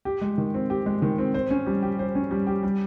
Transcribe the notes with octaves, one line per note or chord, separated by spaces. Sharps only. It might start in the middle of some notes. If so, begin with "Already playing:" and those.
G4
G#3
D#3
C4
G4
G#3
D#3
C4
C5
C#4
G3
G4
C5
C#4
G3
G4
G3